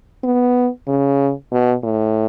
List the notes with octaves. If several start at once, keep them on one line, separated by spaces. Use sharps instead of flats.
B3
C#3
B2
A2